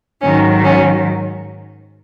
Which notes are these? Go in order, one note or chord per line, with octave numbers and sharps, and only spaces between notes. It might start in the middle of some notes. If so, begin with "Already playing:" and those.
G#2 D#3 F#3 C#4
C#4